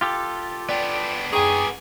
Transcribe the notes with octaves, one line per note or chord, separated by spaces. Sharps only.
F4 G4 A4
B3 D4 D5 G5 A6
F#2 D#4 G#4 G5 C#6